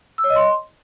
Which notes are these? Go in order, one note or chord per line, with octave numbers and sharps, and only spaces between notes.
E6
C#5
D#5
C6